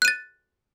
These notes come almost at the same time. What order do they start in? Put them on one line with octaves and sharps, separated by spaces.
F#6 D#7 A6